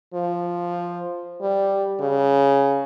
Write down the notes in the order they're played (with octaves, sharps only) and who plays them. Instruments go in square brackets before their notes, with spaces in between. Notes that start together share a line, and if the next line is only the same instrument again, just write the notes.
[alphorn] F3
G3
C#3